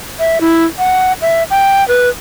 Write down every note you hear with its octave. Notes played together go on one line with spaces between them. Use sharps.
E5
E4
F#5
E5
G5
B4